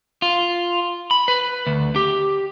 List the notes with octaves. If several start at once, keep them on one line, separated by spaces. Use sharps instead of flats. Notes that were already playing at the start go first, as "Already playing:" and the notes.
F4
B5
B4
D2
G4